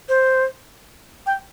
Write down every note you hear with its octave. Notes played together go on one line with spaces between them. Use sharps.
C5
G5